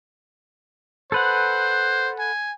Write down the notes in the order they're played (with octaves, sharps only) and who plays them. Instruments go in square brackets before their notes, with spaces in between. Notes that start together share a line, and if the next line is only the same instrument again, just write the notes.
[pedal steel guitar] A4 B4 F#5 [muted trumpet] C5
[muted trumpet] G#5